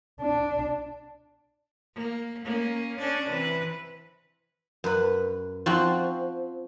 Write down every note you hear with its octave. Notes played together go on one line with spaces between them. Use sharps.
D4
A#3
A#3 C#4
C#4 D4 D5
C3 E3 B4
F#2 B4
F3 C4 F#4